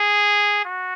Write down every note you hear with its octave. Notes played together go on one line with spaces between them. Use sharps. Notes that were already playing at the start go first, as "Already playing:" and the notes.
Already playing: G#4
F#4